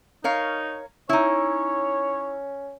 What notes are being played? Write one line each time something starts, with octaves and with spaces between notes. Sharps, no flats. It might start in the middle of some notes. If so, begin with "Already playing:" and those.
D#4 A#4 C#5 F5
C#4 D#4 E4 C#5